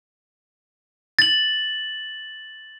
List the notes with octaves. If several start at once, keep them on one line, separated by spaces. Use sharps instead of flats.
A6 F#7